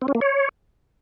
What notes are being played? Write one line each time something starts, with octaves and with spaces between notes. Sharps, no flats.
C4
C#4
A#3
C#5